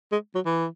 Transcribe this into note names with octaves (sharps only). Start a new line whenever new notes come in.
G#3
F#3
E3